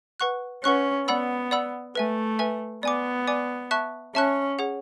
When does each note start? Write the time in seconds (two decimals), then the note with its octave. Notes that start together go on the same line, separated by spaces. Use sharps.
0.20 B4 F#5 C#6 F#6
0.64 C#4 B4 F#5 C#6 F#6
1.07 B3 D5 F#5 B5 E6
1.51 D5 F#5 B5 E6
1.95 A3 B4 E5 G#5
2.39 B4 E5 G#5
2.83 B3 D5 G#5 D6
3.27 D5 G#5 D6
3.71 E5 A5 C#6 F#6
4.15 C#4 E5 A5 C#6 F#6
4.59 G#4 C#5 F#5